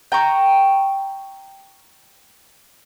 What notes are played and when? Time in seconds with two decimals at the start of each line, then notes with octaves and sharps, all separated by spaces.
0.12 G5 A#5 C#6